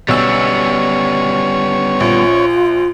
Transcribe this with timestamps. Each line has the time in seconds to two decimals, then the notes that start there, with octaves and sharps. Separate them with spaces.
0.08 B1 G3 B3 C#4 C#5 E6
2.00 A#1 F4